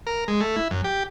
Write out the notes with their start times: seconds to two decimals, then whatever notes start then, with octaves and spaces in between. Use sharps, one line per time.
0.07 A#4
0.28 G#3
0.41 A3
0.56 E4
0.71 F#2
0.84 G4